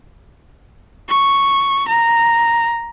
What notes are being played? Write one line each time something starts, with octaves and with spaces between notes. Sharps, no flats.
C#6
A#5